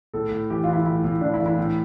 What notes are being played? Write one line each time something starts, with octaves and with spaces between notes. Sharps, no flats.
A2 A4
A2
E3 G4
E3 F4
E4
A2 E4
A2
E3 D4
E4
E3
E4
A2